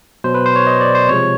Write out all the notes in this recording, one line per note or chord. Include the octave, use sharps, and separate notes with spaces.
B2 F#3 C5
B4
C5
C#5
D#5
D5
C5
C3 F3 G#3 C#5